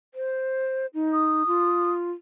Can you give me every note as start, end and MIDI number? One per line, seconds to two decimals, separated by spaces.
0.14 0.86 72
0.94 1.43 63
1.13 1.92 87
1.47 2.12 65